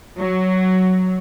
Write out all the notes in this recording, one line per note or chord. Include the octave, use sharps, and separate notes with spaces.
F#3